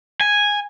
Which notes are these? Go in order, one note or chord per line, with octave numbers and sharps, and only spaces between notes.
G#5